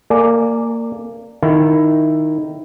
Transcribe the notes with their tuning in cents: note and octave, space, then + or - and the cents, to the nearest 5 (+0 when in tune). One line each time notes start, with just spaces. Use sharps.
A#3 -20 D5 +0 G#5 +10
D#3 -5 E4 +10